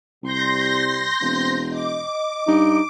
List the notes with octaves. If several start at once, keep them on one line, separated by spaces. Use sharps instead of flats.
C2 C3 G3 C6 G6 A#6
E1 C4
D#5 D6
G2 D#4